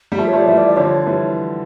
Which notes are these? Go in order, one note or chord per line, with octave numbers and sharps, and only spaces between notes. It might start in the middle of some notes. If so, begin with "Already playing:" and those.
G3
F3 A3 G4
C#5
F3 A3 D5
E3 G3 E5
D5
D5
D3 F3 C#5
E3 G3